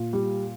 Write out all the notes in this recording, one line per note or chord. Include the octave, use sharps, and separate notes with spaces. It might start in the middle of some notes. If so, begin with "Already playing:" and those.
Already playing: A#2
G3